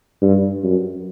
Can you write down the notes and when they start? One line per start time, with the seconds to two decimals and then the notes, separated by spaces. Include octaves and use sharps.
0.22 G2
0.63 F#2